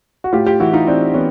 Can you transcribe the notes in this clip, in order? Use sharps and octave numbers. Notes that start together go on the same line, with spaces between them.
F#4
A2 F4 G4
F4 G4
E3 E4 F#4
D#4 F4
E3 C4 D4
E3 B3 C#4